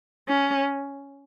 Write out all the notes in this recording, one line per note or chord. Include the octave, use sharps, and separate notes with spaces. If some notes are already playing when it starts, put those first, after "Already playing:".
C#4